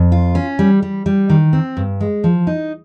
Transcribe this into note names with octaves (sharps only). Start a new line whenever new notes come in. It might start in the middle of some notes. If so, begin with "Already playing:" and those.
Already playing: F2
F4
C#4
G3
G3
G3
D#3
C4
G2
G#3
F3
D#4